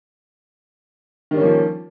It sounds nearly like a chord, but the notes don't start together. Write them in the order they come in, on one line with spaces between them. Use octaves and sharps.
D#3 G3 C#4 A#3 F3